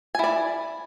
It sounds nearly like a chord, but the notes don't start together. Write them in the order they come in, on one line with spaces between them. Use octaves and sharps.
G#5 E4 D5